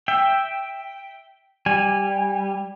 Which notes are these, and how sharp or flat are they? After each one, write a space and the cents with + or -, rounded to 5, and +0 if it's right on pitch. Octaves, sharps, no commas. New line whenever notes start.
E5 +0 G5 +0
G3 +0 G#5 -20